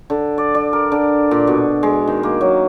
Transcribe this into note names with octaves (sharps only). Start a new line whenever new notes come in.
D3
D5
D5
A#4
D3
A#2
B2
G#3
D#3
A#3
F#3